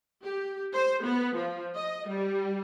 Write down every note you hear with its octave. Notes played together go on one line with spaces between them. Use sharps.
G4
C5
B3
F3
D#5
G3